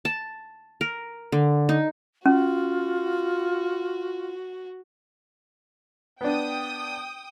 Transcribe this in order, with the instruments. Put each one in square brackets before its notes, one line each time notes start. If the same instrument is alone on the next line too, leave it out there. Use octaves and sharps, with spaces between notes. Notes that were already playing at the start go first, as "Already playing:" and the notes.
[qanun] A5
A#4
D3
D#4
[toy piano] C#4 [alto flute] F4 [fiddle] F#4
[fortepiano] B3 D4 [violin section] G5 D#6